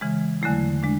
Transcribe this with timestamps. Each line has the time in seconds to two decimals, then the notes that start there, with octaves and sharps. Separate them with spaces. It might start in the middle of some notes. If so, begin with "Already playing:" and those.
0.01 C#3 E3 G#3
0.42 E2 D3 F#3 A3 E4
0.83 G#3 D4